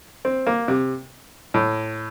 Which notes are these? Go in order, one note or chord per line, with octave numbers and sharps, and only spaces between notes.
C4
A#3
C3
A2